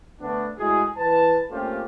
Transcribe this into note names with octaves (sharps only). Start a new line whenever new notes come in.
D3 A3 B3 D4
A2 G#3 E4 F#4 G#4
E3 B4 A5
A3 A#3 C4 C#4 F4 G4